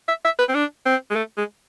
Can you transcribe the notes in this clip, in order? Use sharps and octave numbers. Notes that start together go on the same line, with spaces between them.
E5
E5
B4
C4
D4
C4
G#3
A3
G#3